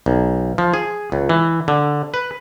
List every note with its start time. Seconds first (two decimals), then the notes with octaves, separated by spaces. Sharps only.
0.06 B1
0.58 F3
0.74 G#4
1.12 C#2
1.29 E3
1.68 D3
2.14 B4